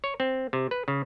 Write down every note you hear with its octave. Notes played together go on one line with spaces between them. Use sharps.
C#5
C4
C3
B4
C#3